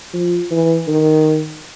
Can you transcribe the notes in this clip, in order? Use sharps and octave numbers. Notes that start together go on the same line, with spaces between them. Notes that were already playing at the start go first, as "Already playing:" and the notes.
F3
E3
D#3